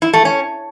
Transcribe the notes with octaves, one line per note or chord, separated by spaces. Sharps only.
E4
A3
C#4